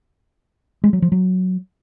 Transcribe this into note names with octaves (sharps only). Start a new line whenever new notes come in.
G#3
F#3
F3
F#3